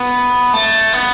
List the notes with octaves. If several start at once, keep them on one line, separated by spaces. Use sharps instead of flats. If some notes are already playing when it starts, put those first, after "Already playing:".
Already playing: B3
A3
B3